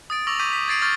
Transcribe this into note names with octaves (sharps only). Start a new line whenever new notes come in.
D#6 A6 D7
C#6 D6 E6 A#6 F7 F#7
C#6 D6 G6 B6 D#7
B6
G#6 A6 C7 D7 D#7 F#7
C#6 E6 F6 G6 A6